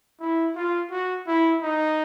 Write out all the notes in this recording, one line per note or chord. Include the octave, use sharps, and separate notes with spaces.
E4
F4
F#4
E4
D#4